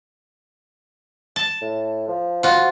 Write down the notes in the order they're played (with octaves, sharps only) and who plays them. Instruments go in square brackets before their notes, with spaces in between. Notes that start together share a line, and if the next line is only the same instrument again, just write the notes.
[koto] A5
[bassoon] A2
F3
[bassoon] F3 [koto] F4 F#4